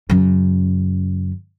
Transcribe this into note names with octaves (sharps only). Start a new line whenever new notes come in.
F#2 C#3